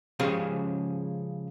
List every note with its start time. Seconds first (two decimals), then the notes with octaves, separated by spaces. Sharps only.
0.20 C#3 F3 G#3 C#4 G4 G#4